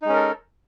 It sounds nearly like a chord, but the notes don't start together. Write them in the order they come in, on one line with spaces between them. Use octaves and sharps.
D#4 G#3 C#4 A#4 A4